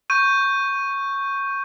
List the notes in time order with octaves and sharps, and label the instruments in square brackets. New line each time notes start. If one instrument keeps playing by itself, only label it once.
[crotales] C#6 G6 D#7